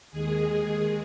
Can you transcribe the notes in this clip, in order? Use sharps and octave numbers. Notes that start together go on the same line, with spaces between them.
D#2 D#3 G#3 G#4